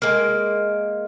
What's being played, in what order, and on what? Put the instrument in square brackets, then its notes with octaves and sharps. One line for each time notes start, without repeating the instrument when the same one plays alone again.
[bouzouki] G#3 A#3